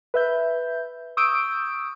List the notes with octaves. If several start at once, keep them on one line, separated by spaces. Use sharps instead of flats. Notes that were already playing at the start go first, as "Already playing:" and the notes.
B4 E5 G6
C#6 D#6 E6 G6 D7